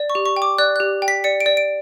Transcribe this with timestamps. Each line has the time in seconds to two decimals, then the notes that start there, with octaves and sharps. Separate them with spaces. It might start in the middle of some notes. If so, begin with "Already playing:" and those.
Already playing: D5
0.10 C#6
0.15 G4
0.26 C#6
0.36 G5
0.42 D6
0.58 D5 F#6
0.76 G4 F#6
1.02 G5
1.08 B6
1.24 D5 C#7
1.40 D7
1.46 D5
1.57 D7